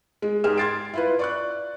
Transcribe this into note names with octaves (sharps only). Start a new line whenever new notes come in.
G#3
G#2 G4 G#4 F6 E7
C6 G#6 A6 C7 D7
E4 F4 B4
D5 C#6 F#6